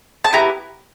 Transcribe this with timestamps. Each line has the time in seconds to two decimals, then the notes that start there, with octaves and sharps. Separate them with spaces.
0.24 A5
0.33 B3 E4 G4 A#5